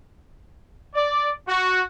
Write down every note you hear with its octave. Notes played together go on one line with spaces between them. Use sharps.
D5
F#4